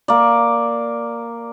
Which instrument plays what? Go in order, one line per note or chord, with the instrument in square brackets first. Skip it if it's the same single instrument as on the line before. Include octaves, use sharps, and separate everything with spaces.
[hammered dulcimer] A#3 D5